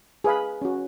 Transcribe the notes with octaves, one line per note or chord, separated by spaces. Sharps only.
G#4 B4 F5 B5
C#4 F#4